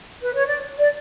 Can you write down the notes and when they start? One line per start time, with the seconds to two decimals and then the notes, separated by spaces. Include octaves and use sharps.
0.22 B4
0.34 C#5
0.46 D5
0.79 D5